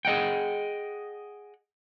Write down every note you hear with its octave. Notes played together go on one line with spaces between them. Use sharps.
G#4 D#5 F#5 G5